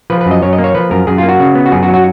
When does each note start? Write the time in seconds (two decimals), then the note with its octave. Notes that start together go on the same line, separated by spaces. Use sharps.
0.10 F3 B4
0.21 B4
0.26 F#2
0.31 D#5
0.42 F#2 C#5
0.53 D#5
0.58 A#3
0.64 C#5
0.75 F3 B4
0.91 F#2 A#4
1.07 F#2 G#4
1.18 F4
1.23 A#3
1.29 F#4
1.40 C#3
1.55 B3
1.66 F#4
1.72 F#2 G#4
1.83 F#4
1.88 F#3
1.94 F#4